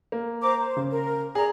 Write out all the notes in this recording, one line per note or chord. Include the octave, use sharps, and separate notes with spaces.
A#3
C5 A#5 D6
C5
C#3
A#4
G#4 D5 A#5